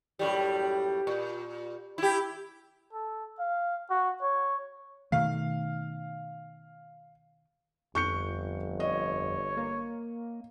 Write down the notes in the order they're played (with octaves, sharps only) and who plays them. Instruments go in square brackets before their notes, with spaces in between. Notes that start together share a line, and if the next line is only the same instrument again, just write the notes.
[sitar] F#2 A2 G3
A#2
E4 G4
[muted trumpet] A4
F5
F#4
C#5
[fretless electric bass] B2 D#3 A3 [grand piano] F5
[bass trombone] G1 [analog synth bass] F2 [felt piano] C#6 G6 C#7
[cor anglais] C#5 [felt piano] D#5
[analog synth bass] A#3